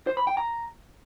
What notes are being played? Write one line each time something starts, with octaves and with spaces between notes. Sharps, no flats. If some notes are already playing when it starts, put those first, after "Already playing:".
C5
B5
G5
A#5